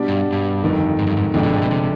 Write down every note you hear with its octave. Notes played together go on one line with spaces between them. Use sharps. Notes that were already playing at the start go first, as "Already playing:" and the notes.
Already playing: B2 G3 D4
G2
G2
G1 F2 D#3
G#2
G2
G#2
F1 F2 G#2 D3 G#3 D4
B2
G#2
B2
C3